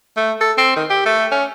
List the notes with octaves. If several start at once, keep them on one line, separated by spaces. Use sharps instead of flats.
A3
A4
C4
D#3
G4
A3
C#4